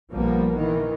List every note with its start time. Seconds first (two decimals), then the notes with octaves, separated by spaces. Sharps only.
0.10 A#1 F3 G3 A#3 B3
0.57 D#3 E3